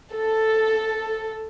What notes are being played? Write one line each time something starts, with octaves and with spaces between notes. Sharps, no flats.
A4